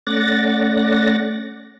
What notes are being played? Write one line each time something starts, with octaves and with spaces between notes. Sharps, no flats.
A3 C#4 D5 F#5 A6 A#6